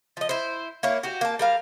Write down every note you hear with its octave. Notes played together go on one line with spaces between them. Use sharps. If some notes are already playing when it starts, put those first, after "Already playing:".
F3 D#5
E4 C5
A#3 E4 C#5
F#4 G4
A#3 A5
G3 A#4 F5